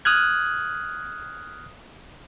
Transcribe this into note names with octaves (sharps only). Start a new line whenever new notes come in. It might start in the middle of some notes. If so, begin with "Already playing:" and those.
D#6 F6 F#6 G#6